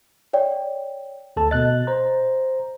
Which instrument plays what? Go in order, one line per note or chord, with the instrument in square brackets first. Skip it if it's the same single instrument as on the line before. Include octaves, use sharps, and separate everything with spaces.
[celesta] C#5 D5 G5
[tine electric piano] D2 A4 A5
[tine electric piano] B2 F#6 A6 [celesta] D#5
[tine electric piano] C5 A#5